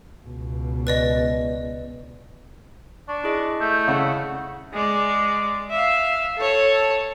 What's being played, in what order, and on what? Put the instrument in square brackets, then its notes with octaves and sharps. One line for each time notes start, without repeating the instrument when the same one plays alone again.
[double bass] C#2 B2
[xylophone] B4 D5 D#5
[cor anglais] D4 [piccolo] C#6
[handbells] E4 G#4 D#5
[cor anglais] A3 [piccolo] G6
[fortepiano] C#3 [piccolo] F#5
[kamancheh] G#3 D5
E5 F5
A4 C#5